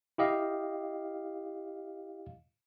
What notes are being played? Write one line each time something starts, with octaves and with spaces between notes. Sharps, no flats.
E4 G4 D#5 F5